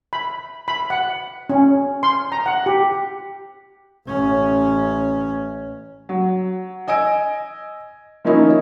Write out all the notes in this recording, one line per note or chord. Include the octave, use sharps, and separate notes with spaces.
B5
B5
F#5
C#4
C6
A#5
F#5
G4
A1 C#4
F#3
D#5 G#5 E6 D7
D#3 F3 A#3 C#4 D#4 E4